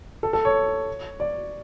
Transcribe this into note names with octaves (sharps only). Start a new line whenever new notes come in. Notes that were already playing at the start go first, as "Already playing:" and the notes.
A4
A4
C#5
D5